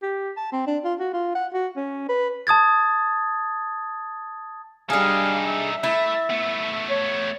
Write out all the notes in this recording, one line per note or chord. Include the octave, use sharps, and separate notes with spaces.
G4
A5
C4
D4
F4
F#4
F4
F#5
F#4
C#4
B4
A5 D#6 G#6 A6
G3 D4 D#4 G#4 A4 F5
E5
A3 E4
A3 B3
C#5